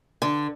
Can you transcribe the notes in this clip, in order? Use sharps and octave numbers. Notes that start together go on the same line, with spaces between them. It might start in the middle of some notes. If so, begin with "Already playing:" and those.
D3